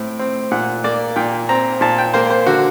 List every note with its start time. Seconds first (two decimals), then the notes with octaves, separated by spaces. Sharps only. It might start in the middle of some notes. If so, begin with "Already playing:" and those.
Already playing: A2 C4
0.19 C4
0.51 A#2 F#5
0.84 A#3 D5
1.16 A#2 G5
1.49 C4 A#5
1.81 A#2 A5
1.98 G5
2.14 A#3 C5
2.30 C5
2.46 D3 F#4